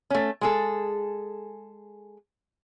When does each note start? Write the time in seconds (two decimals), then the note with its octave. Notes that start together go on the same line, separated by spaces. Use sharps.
0.10 A3 C#4
0.41 G#3 G#4 A4